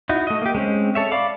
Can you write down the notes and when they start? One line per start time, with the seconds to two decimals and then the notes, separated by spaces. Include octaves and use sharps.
0.09 D#4 E4 F#4
0.27 A3 D#5
0.42 A#3 G4
0.55 G#3 C4 C#4
0.95 A4 C#5 E5
1.11 D5 F5 B5 D6